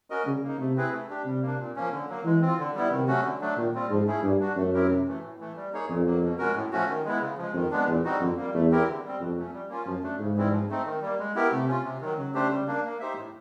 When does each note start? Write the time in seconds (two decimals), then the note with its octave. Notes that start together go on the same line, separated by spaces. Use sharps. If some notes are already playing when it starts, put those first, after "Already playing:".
0.10 C#4 F#4 A#4 D#5
0.26 C#3 G3
0.43 A#3 D#4
0.59 C3 A3
0.76 C4 E4 G#4 B4
0.93 A3
1.09 D4 G4
1.25 C3 G3
1.42 A#3
1.47 D4
1.59 A#2
1.76 F3 A#3 C#4
1.92 D3
2.09 F#3 A#3
2.25 E3 G#3
2.41 C4
2.46 F4
2.58 D3
2.75 G3 B3 E4
2.91 C3 D#3
3.08 F#3 A3 C#4 F#4
3.24 D3
3.41 F#3 A3 D4
3.57 A#2 D#3
3.74 G3 C4 F4
3.90 G#2 F3
4.07 A3 C#4 E4 G#4
4.23 G2 A#3
4.40 D4 F#4
4.56 F#2 A3
4.74 C4 E4 G4 A#4
4.90 C3
5.07 E3 A3
5.23 A2
5.40 E3 A3
5.56 G3
5.72 A#3 D#4 G#4 C#5
5.89 F2 A#2
6.05 F#3 A#3
6.22 B2
6.38 G#3 C#4 F#4 A#4
6.56 A2
6.72 F3 A3 C#4 F#4
6.89 D#3
7.05 G#3 B3 E4
7.21 C#3
7.38 F3 G#3
7.54 F2 D#3
7.71 G#3 B3 D4
7.88 E2 A#2
8.05 G3 C4 D#4 F#4
8.21 F2 D3
8.37 G3 A#3
8.54 E2 A3
8.71 C4 E4 G4 A#4
8.88 D3
9.03 G3 C4
9.20 F2 B2
9.36 F#3 A3 C#4
9.53 G3
9.69 A#3 C#4 F4
9.86 F#2 F3
10.03 A3 D4
10.19 G#2 C#3
10.37 E3 G3 C4 E4
10.52 F3
10.69 A3 C4 D#4
10.86 D#3
11.02 G3 A#3
11.19 G#3
11.35 B3 E4 G4 A#4
11.52 C3 A3
11.68 C#4 F4
11.84 C3
12.01 D#3 F#3
12.18 C#3 F#3
12.34 A3 D4 G4 C5
12.51 G3
12.67 A#3 D4
12.85 A#3
13.00 D#4 G4 C5 E5
13.17 A2